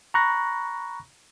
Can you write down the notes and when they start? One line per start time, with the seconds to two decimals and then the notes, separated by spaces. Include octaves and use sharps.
0.14 A#5 B5 C#6 F#6 A#6